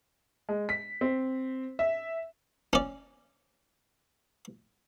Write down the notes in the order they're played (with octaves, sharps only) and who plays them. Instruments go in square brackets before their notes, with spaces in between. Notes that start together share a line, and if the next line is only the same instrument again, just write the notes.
[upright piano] G#3
B6
C4
E5
[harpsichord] C#4 D5